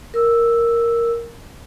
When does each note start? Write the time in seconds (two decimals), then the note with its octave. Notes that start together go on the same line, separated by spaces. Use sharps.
0.14 A#4 E6